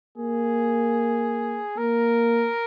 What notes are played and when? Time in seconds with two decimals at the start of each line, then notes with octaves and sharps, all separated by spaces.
0.18 A#3 G#4
1.78 A#3 A#4